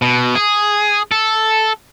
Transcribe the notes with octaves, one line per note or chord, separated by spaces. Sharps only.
B2
G#4
A4